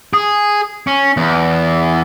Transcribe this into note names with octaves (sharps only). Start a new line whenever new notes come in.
G#4
C#4
E2